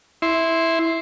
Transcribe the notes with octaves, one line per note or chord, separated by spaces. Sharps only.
E4 C6